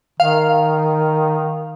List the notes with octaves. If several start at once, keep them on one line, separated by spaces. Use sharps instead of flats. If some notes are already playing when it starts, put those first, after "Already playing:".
D#3 F5